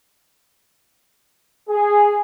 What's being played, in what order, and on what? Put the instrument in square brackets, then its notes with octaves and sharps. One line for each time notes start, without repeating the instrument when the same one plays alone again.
[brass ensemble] G#4